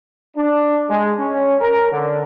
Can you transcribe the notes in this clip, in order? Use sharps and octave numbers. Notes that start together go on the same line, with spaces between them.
D4
G#3
C#4
A#4
D3